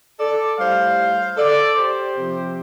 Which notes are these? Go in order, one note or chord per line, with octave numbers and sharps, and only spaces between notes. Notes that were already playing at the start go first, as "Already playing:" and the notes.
A4 D5
A2 G3 C5 F5
A4 D5
G4 C5
C3 F3